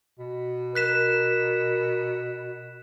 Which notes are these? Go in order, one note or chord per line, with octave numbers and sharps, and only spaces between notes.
B2
A#4 F#6 B6 E7